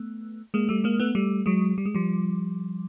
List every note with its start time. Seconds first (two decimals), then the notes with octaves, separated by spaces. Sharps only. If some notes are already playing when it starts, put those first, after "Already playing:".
Already playing: A3 B3
0.54 G#3 A#3
0.69 G3 A3
0.84 G#3 A#3
1.00 A3 B3
1.15 G3 A3
1.46 F#3 G#3
1.78 G3
1.86 G#3
1.95 F3 G3